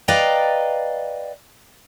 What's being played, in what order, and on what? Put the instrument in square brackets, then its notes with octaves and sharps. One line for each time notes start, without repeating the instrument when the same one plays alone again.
[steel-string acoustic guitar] B4 D5 D#5 F5 G5 A#5